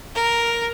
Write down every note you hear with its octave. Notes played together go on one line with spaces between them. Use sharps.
A#4